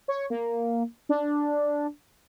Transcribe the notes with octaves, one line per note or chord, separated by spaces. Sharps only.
C#5
A#3
D4